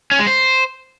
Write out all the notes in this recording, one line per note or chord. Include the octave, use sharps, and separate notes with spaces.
C#4
G#3
C5